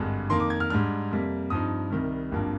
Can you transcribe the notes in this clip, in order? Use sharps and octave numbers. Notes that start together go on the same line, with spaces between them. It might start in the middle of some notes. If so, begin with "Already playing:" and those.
Already playing: G#1 G2 D3 G#3
F2 D#3 A#3 D#4 C6
D6
G#6
F6
G#2 G3 D4 F6
F2 C3 G3 A#3
G2 F3 C4 D#4 D#6
C2 C3 D#3 G3
G#1 G2 F3 A#3 D4